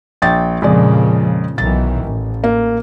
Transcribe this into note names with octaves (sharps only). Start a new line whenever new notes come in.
A#1 G5 A6
F2 A#2 C#3 F3 G#3 D5
B1 D#3 E3 A6
A1
A#3